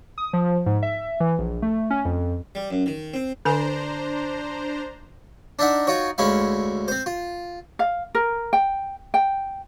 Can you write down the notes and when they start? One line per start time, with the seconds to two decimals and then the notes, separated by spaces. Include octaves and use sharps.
0.18 D#6
0.33 F3
0.66 G#2
0.83 E5
1.20 E3
1.38 A#1
1.62 A3
1.90 C#4
2.05 F2
2.55 G3
2.71 F#2
2.86 D#3
3.14 C4
3.45 D3 D4 B4 C5 G#5 A#5
5.59 D4 D#4 E5 F#5
5.87 D#4 F4 F#4 C#5
6.18 D2 G#3 C#4 E4 F5
6.88 C4 C5
7.06 F4
7.79 F5
8.15 A#4
8.53 G5
9.14 G5